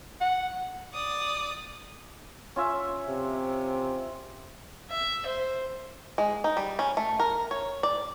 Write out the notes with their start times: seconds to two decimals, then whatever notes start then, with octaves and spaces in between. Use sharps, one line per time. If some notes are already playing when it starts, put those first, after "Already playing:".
0.21 F#5
0.94 D5 D#6
2.56 C#4 F4 E5
3.09 C3
4.91 E5
5.26 C5
6.18 G#3
6.44 D#4
6.57 G3
6.79 C#4
6.97 A3
7.20 A#4
7.51 C#5
7.83 D5